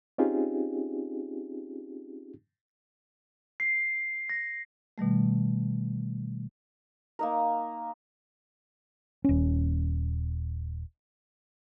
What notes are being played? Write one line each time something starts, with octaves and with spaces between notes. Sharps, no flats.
C4 C#4 D#4 F4 G4 G#4
C7
A#6
B2 D#3 G3 A3
A#3 D#4 A#4
D#1 C#4